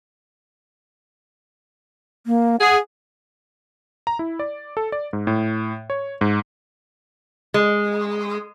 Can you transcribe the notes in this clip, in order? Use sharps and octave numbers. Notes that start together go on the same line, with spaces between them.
A#3
G#4 F#5
A#5
E4
D5
A4
D5
G#2
A2
C#5
G#2
G#3